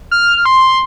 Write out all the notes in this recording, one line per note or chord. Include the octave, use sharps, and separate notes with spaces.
F6
C6